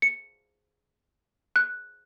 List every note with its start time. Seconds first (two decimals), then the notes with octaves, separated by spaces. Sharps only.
0.02 C#7
1.56 F#6